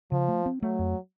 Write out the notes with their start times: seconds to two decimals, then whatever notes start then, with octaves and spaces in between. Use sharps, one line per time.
0.12 C#3 F3
0.28 A3
0.46 C4
0.62 F#3 A3
0.79 F2